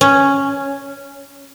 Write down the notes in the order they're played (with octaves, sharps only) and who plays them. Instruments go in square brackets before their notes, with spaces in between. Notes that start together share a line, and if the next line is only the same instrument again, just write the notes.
[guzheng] C#4